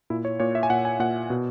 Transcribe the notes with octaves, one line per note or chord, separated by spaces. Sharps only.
A#2 E4
C#5
A#2 C#5
E5
G#5
A#2 F#5
G#5
A#2 F#5
B2